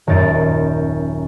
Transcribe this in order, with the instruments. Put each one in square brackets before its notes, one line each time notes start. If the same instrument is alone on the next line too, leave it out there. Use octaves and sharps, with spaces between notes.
[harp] D#1 F#2 D#4 A6 D7